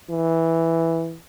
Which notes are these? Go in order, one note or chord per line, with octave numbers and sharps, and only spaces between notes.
E3